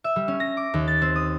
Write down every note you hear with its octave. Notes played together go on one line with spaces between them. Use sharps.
E5
G3
C#4
A#6
D6
D#2
A6
C4
D#6